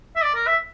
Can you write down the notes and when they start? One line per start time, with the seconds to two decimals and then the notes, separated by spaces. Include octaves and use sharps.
0.16 E5
0.22 D5
0.35 A#4
0.47 E5